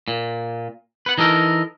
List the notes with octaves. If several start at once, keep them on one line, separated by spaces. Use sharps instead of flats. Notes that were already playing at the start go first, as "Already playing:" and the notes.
A#2
B4 F#5
E3 D#4 A4 A#4